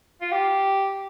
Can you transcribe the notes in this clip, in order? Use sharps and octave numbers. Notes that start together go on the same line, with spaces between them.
F4
G4